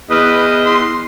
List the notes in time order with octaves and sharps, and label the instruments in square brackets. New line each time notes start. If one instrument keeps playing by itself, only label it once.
[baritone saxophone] E2 [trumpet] B4 [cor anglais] D#5
[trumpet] C6